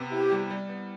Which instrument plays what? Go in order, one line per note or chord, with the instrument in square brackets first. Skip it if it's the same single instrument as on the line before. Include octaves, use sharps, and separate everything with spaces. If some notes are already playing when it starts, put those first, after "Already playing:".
Already playing: [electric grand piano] C3 B3
[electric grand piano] E4 [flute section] G4
[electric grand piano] G3
G3
B3